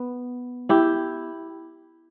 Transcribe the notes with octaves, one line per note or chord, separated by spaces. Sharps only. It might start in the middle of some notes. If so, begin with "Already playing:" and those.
Already playing: B3
E4 G4